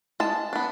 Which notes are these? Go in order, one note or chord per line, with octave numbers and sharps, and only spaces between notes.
G#3 A5
B3 D4